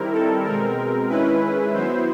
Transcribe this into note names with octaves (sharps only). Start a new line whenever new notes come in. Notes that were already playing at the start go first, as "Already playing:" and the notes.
Already playing: D#3 G3 C4 E4 A#4
A4
B2 G#3 C4 A#4
D#3 G#3 C#4 E4 B4
F#3 B3 E4 C5